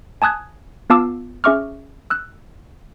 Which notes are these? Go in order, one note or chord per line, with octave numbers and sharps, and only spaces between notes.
G#5 A5 D#6 F#6 G#6
B3 F4 F5 A5 D6 E6
C#4 G#4 E5 C#6 D6 F6
E6 F#6